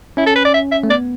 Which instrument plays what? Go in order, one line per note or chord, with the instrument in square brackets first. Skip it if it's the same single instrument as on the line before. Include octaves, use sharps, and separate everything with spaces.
[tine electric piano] C#4 [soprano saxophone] E4
[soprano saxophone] A4
B4
D5
E5
E5
[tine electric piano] A3
[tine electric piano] B3 [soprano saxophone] D5